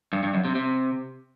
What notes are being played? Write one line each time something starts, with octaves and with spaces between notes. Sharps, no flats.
G2
G2
F#2
C3
C3